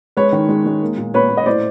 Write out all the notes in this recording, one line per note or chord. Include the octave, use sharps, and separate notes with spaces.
G#3 B4 C#5
D#3
G#3
G#3
A#3
A#2
A#2 B4 C#5
A#2
D#5
A2 C5 D5